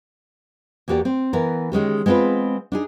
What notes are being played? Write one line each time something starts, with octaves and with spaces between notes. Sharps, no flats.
E2 A#3 F#4 G4 D5
C4
E3 B3 A#4
D#3 G#3 C#4 G4
G#3 B3 C4 F4 B4
D4 D#4 G#4